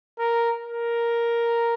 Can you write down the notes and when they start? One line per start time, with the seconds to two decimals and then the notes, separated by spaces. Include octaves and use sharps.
0.19 A#4
0.64 A#4